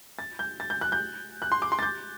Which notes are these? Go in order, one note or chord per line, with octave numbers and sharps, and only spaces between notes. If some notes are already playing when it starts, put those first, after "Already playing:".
A6
G6
A6
G6
F#6
G6
F#6
C6
D6
C6
A6
G6